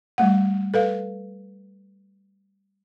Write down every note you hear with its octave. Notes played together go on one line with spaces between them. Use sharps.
G3 A3 F#5
A4 B4 F5